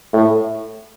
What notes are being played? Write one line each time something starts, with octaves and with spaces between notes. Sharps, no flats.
A2